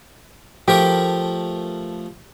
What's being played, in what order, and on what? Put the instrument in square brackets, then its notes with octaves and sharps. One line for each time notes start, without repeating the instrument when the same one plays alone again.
[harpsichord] F3 A3 A#4 [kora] G4